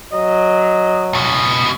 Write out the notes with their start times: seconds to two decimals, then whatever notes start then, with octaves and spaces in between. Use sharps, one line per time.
0.13 F#3 D#5
1.13 C#2 B2